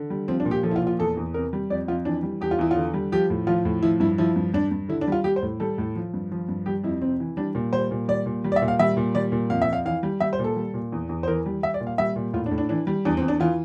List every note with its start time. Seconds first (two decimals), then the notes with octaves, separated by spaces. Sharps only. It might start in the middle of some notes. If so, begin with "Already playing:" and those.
Already playing: D3
0.10 G3
0.28 F3 C4
0.40 D4
0.45 A#2
0.51 G4
0.63 F3 A4
0.71 E4
0.76 F4
0.81 A#2
0.87 F4
0.99 E2 A4
1.17 E2
1.34 C3 A#4
1.53 G3
1.70 F2 D5
1.88 F2 F4
2.05 E3 D4
2.23 G3
2.41 E2 G4
2.51 F4
2.59 E2 E4
2.71 F4
2.76 D3
2.94 G3
3.12 F3 G4
3.30 A2
3.47 F3 F4
3.65 A2
3.82 F3 E4
4.00 G2 E4
4.18 F3 E4
4.36 G2
4.54 G2 D4
4.71 G2
4.89 D3 E4
5.01 D4
5.07 G3 F4
5.24 G3 G4
5.36 C5
5.43 A2
5.60 G3 A4
5.78 A2
5.96 F3
6.14 G2
6.32 F3
6.49 G2
6.66 G3 G4
6.84 F2 E4
7.01 C3 C4
7.20 E3
7.37 G3 D4
7.55 A#2
7.73 G3 C5
7.91 A#2
8.08 G3 D5
8.26 A#2
8.44 G3
8.52 D5
8.56 E5
8.62 A#2
8.68 F5
8.79 G3 E5
8.97 A#2
9.15 G3 D5
9.32 A#2
9.50 F2 F5
9.62 E5
9.68 F2 F5
9.85 E3 F5
10.03 G3
10.20 G3 E5
10.33 C5
10.39 A#2
10.44 A4
10.56 G3
10.74 A#2
10.92 E2
11.09 E2
11.23 C5
11.28 E3 A#4
11.46 G3
11.63 G3 E5
11.74 D5
11.81 A#2
11.87 F5
11.98 G3 E5
12.16 A#2
12.33 A2 F4
12.46 D4
12.51 A2
12.58 D4
12.69 E3 D4
12.87 G3
13.05 E2 D4
13.17 C4
13.22 E2
13.28 D4
13.40 E3 F4